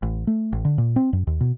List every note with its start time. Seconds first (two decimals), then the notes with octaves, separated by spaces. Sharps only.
0.03 A1
0.27 A3
0.53 A1
0.65 D3
0.78 A#2
0.96 C4
1.13 F#2
1.27 D#2
1.40 B2